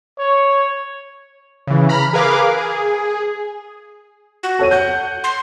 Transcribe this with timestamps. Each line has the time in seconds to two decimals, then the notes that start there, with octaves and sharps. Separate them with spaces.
0.19 C#5
1.67 C#3 E3
1.89 A#5 B5 F6
2.13 G#4 A#4 B4 F5 D6
2.58 G#4
4.43 F#4
4.59 A4 C#5 D#7
4.71 F#5 G6
5.24 C6